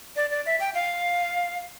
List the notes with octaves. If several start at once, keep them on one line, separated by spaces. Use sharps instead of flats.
D5
D5
E5
G5
F5